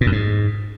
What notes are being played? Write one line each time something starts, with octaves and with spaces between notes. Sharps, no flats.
A#2
F#2
G#2